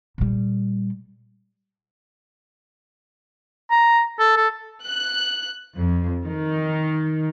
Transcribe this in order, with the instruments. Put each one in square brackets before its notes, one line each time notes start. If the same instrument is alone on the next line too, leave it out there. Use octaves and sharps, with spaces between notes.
[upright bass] A#2 G3
[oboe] A#5
A4
A4
[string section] F#6
F2
D#3